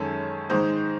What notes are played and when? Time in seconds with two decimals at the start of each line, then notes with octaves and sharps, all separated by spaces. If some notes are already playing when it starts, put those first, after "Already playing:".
Already playing: F#2 D#3 G#3 C#4 A4
0.50 G#2 D#3 G#3 D#4 C5